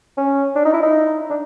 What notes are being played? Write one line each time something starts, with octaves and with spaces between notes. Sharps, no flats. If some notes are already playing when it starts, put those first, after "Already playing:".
C#4
D4
D#4
E4
D#4
D4